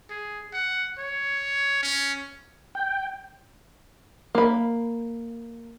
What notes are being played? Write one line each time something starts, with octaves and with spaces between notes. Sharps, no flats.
G#4
F#5
C#5
C#4
G5
A#3 B5